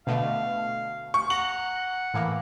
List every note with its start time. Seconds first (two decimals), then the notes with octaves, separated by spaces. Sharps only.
0.07 B2 D3 A3 F5
1.14 C#6
1.30 F#5 A#5 F#7
2.14 A2 E3 A#3